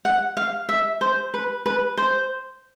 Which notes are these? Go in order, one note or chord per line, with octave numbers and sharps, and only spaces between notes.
F#5
F5
E5
C5
B4
B4
C5